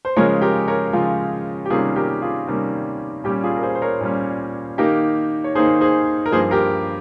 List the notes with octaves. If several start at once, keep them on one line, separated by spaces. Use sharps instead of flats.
C5
C#3 F3 G#3 A#4 C#5
G4 A#4
A#4 C#5
C#3 F3 G#3 F4
G4
C3 D#3 G3 A#3 C#4 F4 G#4
G4 A#4
F4 G#4
C3 D#3 G3 A#3 C#4
A#2 G3 C#4 G4
F4 G#4
A#4
G#4 C5
C5
A#4 C#5
A#2 G3 C#4
D#3 A#3 D#4 G4 A#4
C#5
D#3 A#3 D#4 G#4 C5
G#4 C5
A#4
G2 F3 A#3 G#4 C5
G4 A#4